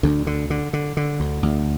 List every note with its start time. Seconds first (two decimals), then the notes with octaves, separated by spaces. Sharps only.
0.03 D2 D3
0.27 D3
0.50 D3
0.73 D3
0.97 D3
1.20 D2
1.43 D2